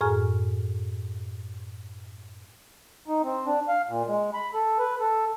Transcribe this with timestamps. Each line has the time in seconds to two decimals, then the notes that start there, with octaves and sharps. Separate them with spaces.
0.01 F#2 A2 G#4 G#5 F6
3.08 D#4
3.23 C4
3.46 D4
3.68 F5
3.89 A#2
4.07 G#3
4.34 B5
4.54 A4
4.79 B4
5.00 A4